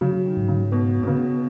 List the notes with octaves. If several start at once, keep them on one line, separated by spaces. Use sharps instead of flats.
C#3 F#3
D#3
G#2
C#3
B2 B3
B2
C#3 B3